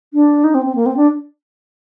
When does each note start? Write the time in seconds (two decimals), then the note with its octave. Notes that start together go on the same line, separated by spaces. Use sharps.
0.14 D4
0.44 D#4
0.54 C4
0.65 C4
0.75 A#3
0.86 C4
0.97 D4